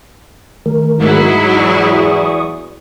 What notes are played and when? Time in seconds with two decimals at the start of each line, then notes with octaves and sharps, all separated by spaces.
0.66 D#3 A3 A#4
1.00 G#2 F#3 D#4 E4 G#4
1.55 E2 D5 C#6 D#6